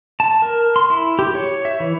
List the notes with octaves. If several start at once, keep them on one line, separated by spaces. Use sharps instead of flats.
A5
A#4
C6
E4
G4
C#5
E5
E3